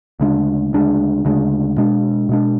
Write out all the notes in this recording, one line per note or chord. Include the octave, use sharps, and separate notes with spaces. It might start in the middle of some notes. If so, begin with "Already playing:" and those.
D2 C#3 G#3 D4
D2 C#3 G#3 D4
D2 C#3 G#3 D4
B2 G#3 D4
B2 G#3 D4